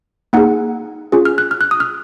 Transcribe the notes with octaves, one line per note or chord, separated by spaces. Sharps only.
A#3 D#4 G#4 F#5
C#4 F4 G#4
F6
F#6
F6
F#6
D#6
F6